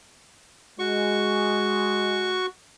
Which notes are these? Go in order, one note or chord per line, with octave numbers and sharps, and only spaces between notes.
G#3 F#4 C#6